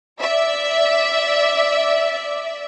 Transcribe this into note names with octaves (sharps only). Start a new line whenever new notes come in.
D5 E5